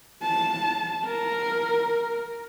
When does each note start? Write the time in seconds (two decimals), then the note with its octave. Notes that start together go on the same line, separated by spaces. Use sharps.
0.23 A5
1.05 A#4